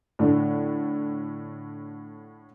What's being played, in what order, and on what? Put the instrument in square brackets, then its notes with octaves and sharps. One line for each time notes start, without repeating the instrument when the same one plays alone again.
[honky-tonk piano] A2 D3